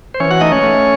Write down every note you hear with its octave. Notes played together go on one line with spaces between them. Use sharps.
C5
E3 C#4 C#5
F#4 F#5
A3 D#4 D#5
C#4 C#5
A3